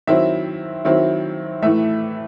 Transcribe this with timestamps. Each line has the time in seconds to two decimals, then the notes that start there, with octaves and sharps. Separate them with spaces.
0.07 D#3 F#3 C4 E4 E5
0.85 D#3 F#3 C4 E4
1.63 A2 E3 A3 E5